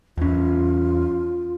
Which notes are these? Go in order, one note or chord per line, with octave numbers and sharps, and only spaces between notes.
E2 C#4 F4